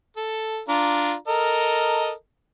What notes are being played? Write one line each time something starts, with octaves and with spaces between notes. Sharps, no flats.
A4
D4 F4 A#5
A4 A#4 D#5